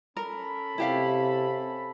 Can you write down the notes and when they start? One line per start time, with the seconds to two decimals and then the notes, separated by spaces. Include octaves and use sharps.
0.17 C#4 A4 A#4 B5
0.78 C3 E4 G4 F5